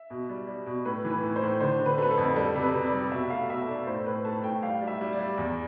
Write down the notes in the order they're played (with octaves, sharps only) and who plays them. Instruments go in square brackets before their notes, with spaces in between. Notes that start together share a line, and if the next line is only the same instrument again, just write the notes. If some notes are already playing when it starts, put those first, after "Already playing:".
Already playing: [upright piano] E5
B2
G3
G3
B2
A2 B4
E3
B4
A2
C5
A2
D3 C5
D3
B4
A3 B4
A4
F2
G3 A4
C3
B4
C3
D5
G3
B2 E5
A3 F5
B2 E5
A3 D5
A2 C5
A2 B4
A3 A5
A2 G5
G3 F5
G3
E5
G3
D5
G3
E2